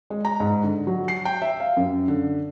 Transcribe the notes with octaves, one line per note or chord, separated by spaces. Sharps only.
G#3
A#5
G#2
D3
F#3
C7
G5
E5
F5
F#2
D3